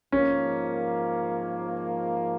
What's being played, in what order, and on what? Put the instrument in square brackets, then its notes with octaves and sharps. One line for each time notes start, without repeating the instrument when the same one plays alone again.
[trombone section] G#2 F3 A#3 [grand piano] C#4